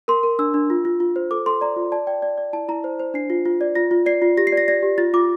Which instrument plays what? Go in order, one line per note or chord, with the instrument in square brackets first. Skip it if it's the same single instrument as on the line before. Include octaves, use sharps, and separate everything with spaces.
[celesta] A#4 C6
A#4
D4 E6
D4
F4
F4
F4
C5
A4 D6
A4 C6
D5 A#5
F4
D5 A5
D5 G5
D5
D5
E4 A5
E4 A#5
C5
C5
D4 C7
F4
F4
D5
F4 A#6
F4
D5 C7
F4
G4 A#6
C7
D5
A#6
D5 A#6
G4
F4 A6
F4 D6